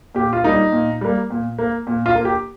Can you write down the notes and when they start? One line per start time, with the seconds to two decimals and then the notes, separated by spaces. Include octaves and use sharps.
0.15 A#2 G4
0.33 F4
0.44 G3 A#3 D#4
0.72 A#2
1.01 G3 A#3
1.30 A#2
1.59 A#3
1.87 A#2
2.06 F4
2.15 A#3
2.25 G4